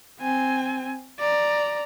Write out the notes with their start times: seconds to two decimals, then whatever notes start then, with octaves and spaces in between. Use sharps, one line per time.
0.20 C4 G#5
1.19 D5 A#5